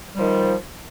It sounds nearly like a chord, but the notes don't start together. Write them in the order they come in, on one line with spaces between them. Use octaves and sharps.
G3 F3 D#3